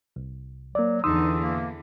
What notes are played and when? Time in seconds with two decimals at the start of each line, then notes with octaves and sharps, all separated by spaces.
0.16 C2
0.75 F#3 A#3 D5
1.04 E2 D3 E3 D#4 C6 D#6 E6
1.42 A#3